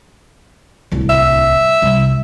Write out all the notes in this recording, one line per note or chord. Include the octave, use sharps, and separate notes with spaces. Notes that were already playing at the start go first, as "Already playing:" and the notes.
D1 C2
E5
C2